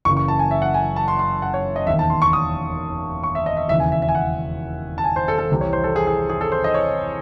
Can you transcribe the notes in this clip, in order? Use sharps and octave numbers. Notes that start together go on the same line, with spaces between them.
F#1 F#2 C#3 E3 C#6
C#6
A5
G#5
E5
F#5
G#5
A5
C6
C6
F#5
C#5
D#5
E1 D#2 D#3 E5
A5
C6
C#6
D#6
C#6
E5
D#5
E5
E1 D#2 C#3 E3 E5
G#5
E5
E5
G#5
F#5
A5
G#5
C5
A4
A4
C2 C3 E3
C#5
C5
A4
G#4
G#4
G#4
A4
C5
D#5
C#5